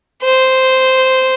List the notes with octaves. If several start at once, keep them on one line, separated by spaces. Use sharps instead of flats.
C5